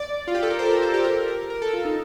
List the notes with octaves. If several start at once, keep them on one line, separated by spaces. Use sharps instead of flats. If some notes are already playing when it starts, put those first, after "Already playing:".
Already playing: D5
F4
G4
A4
A#4
C5
A4
A#4
A4
G4
A#4
A#4
A#4
A4
F4
D#4